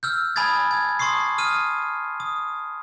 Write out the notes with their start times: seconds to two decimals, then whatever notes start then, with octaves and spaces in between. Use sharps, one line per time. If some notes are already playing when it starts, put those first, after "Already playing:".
0.03 E6 F6 G6
0.36 G#5 A5 B5 D#6 G#6 A6
0.71 G#6
0.99 A5 C6 C#6 D#6 C7
1.38 D#6 F6 D#7
2.20 D#6